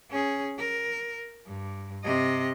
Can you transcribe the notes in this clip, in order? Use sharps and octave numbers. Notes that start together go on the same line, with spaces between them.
C#4 G#4
A#4
G2
C3 D#5